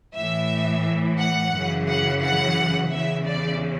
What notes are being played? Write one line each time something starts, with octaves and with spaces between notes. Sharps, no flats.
A2 E3 E5
F#5
F#2 C#3 E3
F#5
F#5
E2 C#3 E3 E5
D5